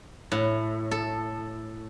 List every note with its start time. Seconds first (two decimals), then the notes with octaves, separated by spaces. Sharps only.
0.32 A2
0.91 A4